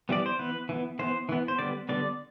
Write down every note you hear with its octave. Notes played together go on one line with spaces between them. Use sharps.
E3 G3 B3 D5
C5
E3 B3 B4
E3 B3
E3 B3 C5
E3 B3
C5
D3 G3 B3 D5
D3 G3 B3 D5